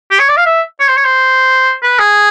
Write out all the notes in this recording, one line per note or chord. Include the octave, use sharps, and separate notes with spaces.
G4
C#5
D5
F5
E5
C#5
C5
C#5
C5
B4
G#4